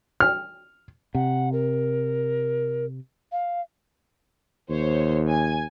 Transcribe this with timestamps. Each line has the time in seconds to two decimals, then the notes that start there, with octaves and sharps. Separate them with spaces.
0.20 F6
1.15 C3 F#5
1.53 A#4
3.32 F5
4.70 D#2 C5 C#5
5.27 G#5 G#6